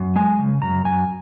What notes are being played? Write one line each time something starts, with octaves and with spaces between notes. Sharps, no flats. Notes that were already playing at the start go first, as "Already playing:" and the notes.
Already playing: F#2
G#3 G#5
C#3
F#2 A#5
F#2 G#5